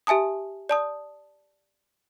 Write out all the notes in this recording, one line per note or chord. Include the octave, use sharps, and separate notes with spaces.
G4 E5 G#5 A5 D#6
D5 A5 D#6